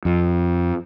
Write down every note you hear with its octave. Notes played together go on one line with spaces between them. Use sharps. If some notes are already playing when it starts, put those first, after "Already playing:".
F2